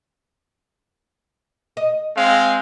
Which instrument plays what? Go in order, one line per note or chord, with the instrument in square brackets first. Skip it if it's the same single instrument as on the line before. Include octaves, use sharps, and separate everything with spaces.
[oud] D#5
[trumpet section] G#3 C4 F5